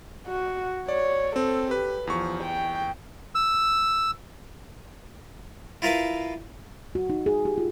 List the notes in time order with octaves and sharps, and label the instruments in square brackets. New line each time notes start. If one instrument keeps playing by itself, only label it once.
[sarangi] F#4
[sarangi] C#5 [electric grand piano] D5
[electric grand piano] C4 [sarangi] A4
[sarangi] G4 [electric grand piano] B4
[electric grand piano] E2 C#6 [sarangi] F3
[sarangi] G5
[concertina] E6
[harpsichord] E4 F4 A#4 B4 F5
[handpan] F#4
D#4
G#4
G4
F4